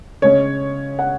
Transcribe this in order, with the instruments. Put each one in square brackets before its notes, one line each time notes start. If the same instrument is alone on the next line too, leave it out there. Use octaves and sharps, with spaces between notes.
[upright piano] C#3 G#3 C#4 C#5
F#5